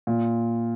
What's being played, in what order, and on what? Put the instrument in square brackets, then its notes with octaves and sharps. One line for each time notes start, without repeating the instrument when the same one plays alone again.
[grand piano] A#2